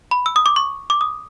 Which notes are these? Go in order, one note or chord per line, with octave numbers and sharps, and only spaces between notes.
B5
E6
D#6
D6
C#6
D6
D#6